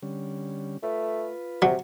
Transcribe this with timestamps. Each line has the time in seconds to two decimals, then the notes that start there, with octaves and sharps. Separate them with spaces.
0.03 D3 G3 C#4
0.83 A3 F4 B4
1.62 C3 F#3